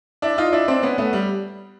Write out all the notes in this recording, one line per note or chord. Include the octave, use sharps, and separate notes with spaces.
D4 E4
D#4 F4
D4 E4
C4 D4
B3 C#4
A3 B3
G3